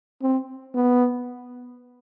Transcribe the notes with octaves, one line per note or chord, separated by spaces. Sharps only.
C4
B3